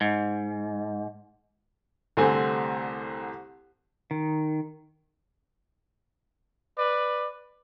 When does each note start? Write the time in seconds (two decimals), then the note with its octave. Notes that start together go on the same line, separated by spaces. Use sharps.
0.01 G#2
2.17 C2 D3 A3 C4 G#5
4.11 D#3
6.76 B4 D5